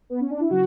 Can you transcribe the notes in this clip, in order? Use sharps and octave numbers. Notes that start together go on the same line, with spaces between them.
B3
C#4
D4
E4
C#3 F#3 F#4